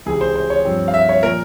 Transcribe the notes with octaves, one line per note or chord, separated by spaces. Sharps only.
C#2 C3 E3 G#4
C5
C5
C#5
G2 F3 C4
F5
E5
C#5
A#2 F3 A#4